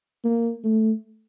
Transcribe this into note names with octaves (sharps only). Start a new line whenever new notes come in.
A#3
A3